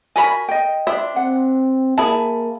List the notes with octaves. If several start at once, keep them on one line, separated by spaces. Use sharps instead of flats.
F#4 A4 A#4 G#5 B5
D#5 G5
D4 C5 E5
C4 F#5
A#3 E4 G#4 A5